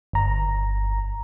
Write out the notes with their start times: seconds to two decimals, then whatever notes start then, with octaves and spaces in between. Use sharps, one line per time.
0.13 G1 A#5